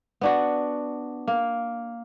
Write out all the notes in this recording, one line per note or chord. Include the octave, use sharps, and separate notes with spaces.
B3 D4 F#4
A#3